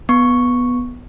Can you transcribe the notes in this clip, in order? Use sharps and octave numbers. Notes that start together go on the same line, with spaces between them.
B3 C#6